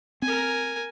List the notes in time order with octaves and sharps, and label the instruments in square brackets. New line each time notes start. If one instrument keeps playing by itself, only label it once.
[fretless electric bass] C4 [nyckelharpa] A#4 G#5